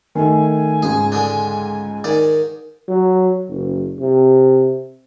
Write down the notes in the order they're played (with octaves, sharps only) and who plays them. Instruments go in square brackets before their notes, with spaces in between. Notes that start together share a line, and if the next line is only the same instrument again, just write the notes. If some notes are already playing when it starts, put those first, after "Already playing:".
[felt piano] D#3 A3 [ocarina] G#5
[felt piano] C#2 G#2 [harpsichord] G#4
[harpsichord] D3 G#3 D4
G#2 D#3 D5
[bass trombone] F#3
F#1
C3